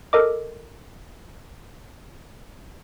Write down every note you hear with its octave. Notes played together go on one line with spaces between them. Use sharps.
A4 A#4 D#5 D6